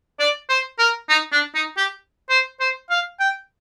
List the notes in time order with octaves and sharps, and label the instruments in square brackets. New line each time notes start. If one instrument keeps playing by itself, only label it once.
[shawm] D5
C5
A#4
D#4
D4
D#4
G4
C5
C5
F5
G5